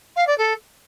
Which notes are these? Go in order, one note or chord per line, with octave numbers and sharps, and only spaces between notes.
F5
D5
A4